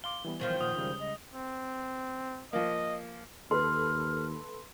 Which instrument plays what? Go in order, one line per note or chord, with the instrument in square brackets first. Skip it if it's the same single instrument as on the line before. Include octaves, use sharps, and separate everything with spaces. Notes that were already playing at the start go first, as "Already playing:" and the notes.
[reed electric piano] F5 C6 D6 [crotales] G7
[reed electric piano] E3 G3 B3
[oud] F#2 D#3 F3 [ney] C5
[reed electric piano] A#2 F#5 [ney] C5 [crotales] D#6
[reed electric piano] C#3 G3 G#3
[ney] D#5
[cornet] C4
[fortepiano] F3 A#3 [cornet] D#5
[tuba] D#2 [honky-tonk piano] A4 B4 [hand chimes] C6 [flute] F6